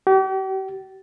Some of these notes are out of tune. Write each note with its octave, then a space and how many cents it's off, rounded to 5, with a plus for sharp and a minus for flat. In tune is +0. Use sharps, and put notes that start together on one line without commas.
G4 -45